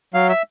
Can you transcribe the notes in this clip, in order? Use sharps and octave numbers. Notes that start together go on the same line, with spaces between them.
F#3 F5
E5